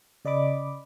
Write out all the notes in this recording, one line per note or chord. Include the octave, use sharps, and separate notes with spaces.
C#3 D5 D#5 B5 D6